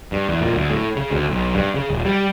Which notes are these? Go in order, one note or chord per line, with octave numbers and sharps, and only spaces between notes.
G2
E2
A#2
D2
A2
C#3
D2
B1
G2
C#3
D#1
G3